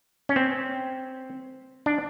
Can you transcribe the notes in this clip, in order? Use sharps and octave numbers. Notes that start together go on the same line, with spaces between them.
C#4
C4
D4